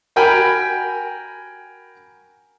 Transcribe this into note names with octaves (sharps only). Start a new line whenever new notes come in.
F#4 A#4 G5 G#5 B5